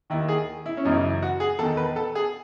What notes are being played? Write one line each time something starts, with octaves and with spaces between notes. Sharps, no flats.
D#2 D#3 E4
G#4
E4
C#4
F#2 C#3 E3 D#4
F#4
G#4
E2 D#3 A4
B4
A4
G#4